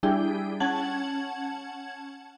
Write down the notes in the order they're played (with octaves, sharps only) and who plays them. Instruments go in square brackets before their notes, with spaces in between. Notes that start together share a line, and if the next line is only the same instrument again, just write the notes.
[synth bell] G3 D4 E4 G#4 G5
C#4 F#5 A5 G#6 F#7